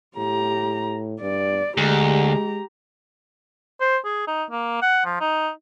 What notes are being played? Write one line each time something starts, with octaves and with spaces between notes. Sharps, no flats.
A2 G4 A#5
G2 D5
D2 G#3 G4 A#5
C5
G#4
D#4
A#3
F#5
F3
D#4